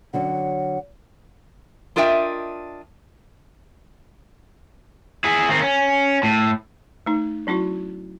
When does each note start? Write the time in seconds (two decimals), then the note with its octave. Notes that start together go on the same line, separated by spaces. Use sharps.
0.14 D3 F#3 C#4 F#5
1.96 D4 F4 A#4 D#5 E5 G5
5.24 E4 G#4
5.49 D#3 C4
5.61 C#4
6.23 A2
7.06 A3 D#4
7.47 F#3 C#4 E4 F#4